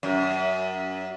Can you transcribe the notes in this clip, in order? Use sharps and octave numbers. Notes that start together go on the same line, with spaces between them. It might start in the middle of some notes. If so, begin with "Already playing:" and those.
F#2